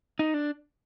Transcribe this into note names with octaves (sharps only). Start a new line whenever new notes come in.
D#4
D4